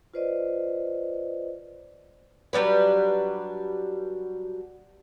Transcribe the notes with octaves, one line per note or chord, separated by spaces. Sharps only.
F4 B4 C5 D5 D#5
F#3 G3 D4 B4